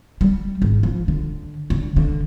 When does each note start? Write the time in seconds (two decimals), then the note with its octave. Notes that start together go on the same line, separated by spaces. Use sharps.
0.21 G3
0.62 G#1
0.83 F3
1.08 D3
1.70 D3
1.96 D3